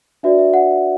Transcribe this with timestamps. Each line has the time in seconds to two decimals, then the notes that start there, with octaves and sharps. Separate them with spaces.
0.23 D4 F#4 B4 D5 E5
0.39 E5
0.54 F#5